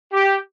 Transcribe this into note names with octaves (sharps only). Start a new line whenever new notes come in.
G4